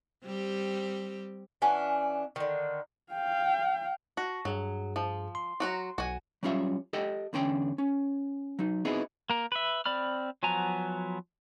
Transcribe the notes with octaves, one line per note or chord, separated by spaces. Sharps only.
G3 C4 G4
E3 C#4 D4 F#5
D3 D#3
F5 G5
F#4 A5 C#6 A#6
G2 F#3 G#4
F3
C6
F#3 F#4 A#5
B1 F#4 G#5
F#3 G3 C#4 F4 E5
G4 A4 D#5 G5
E2 D3 C#4 G5
C#4
F#3 D#4
B3 C4 D#4 E4 F#4 G#4
A#3 A#4
B4 E5
C4 D5 B5 F6
F3 F#3 B3 G#5 A#5